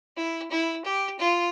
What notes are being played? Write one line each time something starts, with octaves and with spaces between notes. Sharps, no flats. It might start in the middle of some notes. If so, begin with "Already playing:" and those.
E4
E4
G4
F4